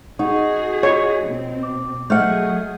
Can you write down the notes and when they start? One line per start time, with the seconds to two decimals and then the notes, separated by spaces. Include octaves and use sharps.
0.19 D#4 F#4 G#4 D#5 F#5 C#6
0.83 F4 C#5 D#5
1.25 B2 C4
1.63 D6
2.10 F#3 A3 G#4 D#5 F#5 F6 G6